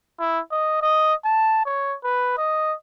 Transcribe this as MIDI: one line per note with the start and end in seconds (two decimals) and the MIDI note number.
0.19 0.39 64
0.52 0.80 75
0.82 1.14 75
1.25 1.65 81
1.66 1.96 73
2.04 2.34 71
2.38 2.74 75